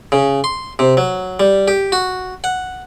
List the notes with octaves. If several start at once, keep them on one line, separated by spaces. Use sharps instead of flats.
C#3
C6
C3
F#3
G3
G4
F#4
F#5